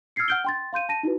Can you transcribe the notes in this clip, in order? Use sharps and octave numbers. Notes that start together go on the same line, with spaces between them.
E6 F6 G#6 A6 C7 C#7
F#5 F6 G6 D7 G7
G5 C6 A6
F5 C6 G6 D#7
A5 A#6 D#7
D#4 E4 F#4 B4